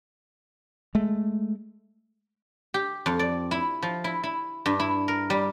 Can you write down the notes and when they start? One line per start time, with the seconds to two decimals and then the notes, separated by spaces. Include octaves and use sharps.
0.95 G#3 A3
2.74 G4
3.06 F2
3.19 D5
3.51 E4
3.82 F3
4.04 E4
4.24 E4
4.66 G2
4.80 E4
5.08 A#4
5.30 G3